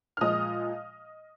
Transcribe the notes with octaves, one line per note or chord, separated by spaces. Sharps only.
F6
A#2 F3 G#3 D#5 D#6